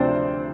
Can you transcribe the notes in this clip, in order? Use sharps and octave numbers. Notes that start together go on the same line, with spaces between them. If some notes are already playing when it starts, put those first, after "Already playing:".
Already playing: D2 C3 F3 C4 D4 C5 D5